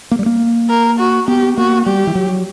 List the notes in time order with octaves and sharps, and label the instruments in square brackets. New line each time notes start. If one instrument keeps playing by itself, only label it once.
[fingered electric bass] A#3
G3
A#3
[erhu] A#4
F#4
[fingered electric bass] B3 [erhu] G4
[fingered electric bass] A#3 [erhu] F#4
[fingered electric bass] G3 [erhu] G4
[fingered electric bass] E3
F#3